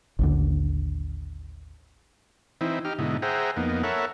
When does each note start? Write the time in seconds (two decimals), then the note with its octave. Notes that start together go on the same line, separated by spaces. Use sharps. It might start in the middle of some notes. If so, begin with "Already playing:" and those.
0.19 A1 D#2 D3
2.61 E3 C4 D#4 E4
2.85 D#4 G4 F6
2.99 G#2 B2 D3 D#4 E4
3.22 G#4 C5 E5 F#5 G5 A#5
3.57 F2 A#3 B3 D#4
3.83 A4 A#4 C#5 E5 F#5 B5